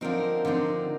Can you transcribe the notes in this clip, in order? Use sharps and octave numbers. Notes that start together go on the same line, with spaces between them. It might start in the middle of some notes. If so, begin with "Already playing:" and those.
D3 F3 C4 D#4 A#4
D3 F3 C4 D#4